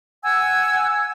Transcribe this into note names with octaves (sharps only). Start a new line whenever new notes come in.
F#5 G#5 E6 G#6